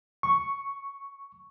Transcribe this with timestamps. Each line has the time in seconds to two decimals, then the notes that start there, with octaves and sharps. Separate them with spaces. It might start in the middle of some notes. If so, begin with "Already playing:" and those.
0.23 C#6